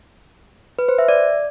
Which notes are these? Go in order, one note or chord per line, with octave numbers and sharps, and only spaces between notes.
B4
C5
E5
D5